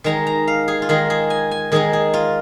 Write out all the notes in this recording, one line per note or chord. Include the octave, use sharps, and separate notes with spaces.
D#3 G#3 D#4 A#5
A#5
F5
G#4
F4
D#3 G#3 D#4 G#4
G#4
G#5
G#5
D#3 G#3 D#4 G#4
G#4
F4